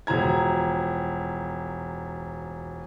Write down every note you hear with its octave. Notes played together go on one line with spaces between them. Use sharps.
E1 F3 A#5 G#6